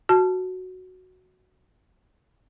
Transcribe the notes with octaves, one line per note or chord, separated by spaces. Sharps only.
F#4 A5